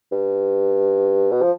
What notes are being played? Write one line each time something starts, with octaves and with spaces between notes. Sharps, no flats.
G2
B2
F3